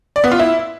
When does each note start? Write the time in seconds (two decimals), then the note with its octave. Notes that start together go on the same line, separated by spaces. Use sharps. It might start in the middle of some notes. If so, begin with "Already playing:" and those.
0.16 D5
0.24 B3
0.32 F4
0.39 E4